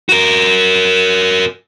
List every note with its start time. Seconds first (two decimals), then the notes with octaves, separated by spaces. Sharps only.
0.09 F#4 A#4